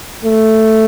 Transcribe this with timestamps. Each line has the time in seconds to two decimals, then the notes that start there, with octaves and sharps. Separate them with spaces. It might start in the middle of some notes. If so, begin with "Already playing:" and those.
0.25 A3